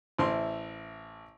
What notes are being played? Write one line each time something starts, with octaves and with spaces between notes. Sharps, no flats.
A1 E4 C5 C6